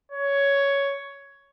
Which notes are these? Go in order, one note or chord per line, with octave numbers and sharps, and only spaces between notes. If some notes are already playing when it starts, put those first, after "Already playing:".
C#5